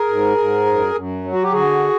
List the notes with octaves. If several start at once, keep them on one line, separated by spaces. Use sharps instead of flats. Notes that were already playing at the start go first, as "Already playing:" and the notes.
Already playing: G#4 A#4
G#2
G#2
F#2
F#2
F#3
F#4
G4
D3 F#4 G#4